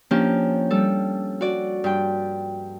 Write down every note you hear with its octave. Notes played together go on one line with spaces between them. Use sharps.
F3 A#3 C#4 D4 G4
G3 A4
F#4 D5
G2 G5